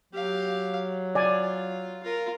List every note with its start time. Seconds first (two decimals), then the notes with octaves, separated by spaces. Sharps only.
0.13 F#3 G4 F5
1.15 F4 D5 G#5
2.03 F4 A#4